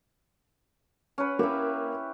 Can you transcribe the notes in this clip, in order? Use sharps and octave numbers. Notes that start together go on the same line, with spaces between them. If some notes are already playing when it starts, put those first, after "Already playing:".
C#4 B4
A#3 E4 G4